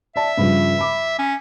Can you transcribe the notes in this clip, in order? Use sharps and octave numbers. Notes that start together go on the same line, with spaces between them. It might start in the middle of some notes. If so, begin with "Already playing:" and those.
D5 E5 A5
G2 C#3 F3
B5 D6
C#4